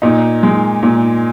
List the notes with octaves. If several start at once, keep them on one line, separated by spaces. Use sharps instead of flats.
A#2 D#4
G#3
A#2